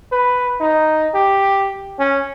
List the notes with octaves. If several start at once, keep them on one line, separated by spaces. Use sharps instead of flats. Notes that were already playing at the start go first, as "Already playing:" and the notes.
B4
D#4
G4
C#4